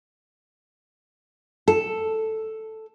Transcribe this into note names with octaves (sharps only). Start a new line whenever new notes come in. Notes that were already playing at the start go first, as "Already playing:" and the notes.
A4